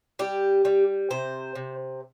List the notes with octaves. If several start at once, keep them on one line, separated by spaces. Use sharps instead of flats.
G3 G4
G3
C3 C5
C3